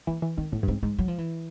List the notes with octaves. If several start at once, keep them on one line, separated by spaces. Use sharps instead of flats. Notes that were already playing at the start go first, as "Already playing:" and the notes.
E3 A#3
E3
D#3 C4
A2 B3
G2
G#2 C4
G#2 G#3
F#3
F3
E3